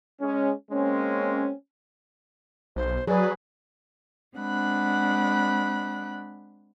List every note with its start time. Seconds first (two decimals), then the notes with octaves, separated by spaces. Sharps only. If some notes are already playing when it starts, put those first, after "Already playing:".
0.21 G#3 C#4
0.72 G#3 A#3 C4 C#4
2.76 B1 C5
3.07 F#3 G#4 B4 D5
4.37 G#3 C4 D4 F#5 B5 F#6